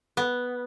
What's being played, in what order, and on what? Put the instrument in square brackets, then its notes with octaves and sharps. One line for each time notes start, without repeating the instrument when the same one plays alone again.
[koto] B3